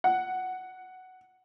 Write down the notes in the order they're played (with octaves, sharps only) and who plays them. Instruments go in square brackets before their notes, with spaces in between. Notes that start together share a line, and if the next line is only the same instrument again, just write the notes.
[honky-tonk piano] F#5